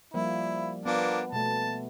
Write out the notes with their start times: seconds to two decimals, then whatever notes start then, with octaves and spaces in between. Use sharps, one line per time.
0.14 F3 G3 A#3 E4
0.85 F3 A#3 B3 D4
1.32 B2 A3 A5